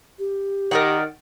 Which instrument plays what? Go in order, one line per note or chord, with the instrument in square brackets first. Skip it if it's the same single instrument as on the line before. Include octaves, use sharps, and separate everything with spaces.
[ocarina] G4
[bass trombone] D#3 [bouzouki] A#4 D5 F#5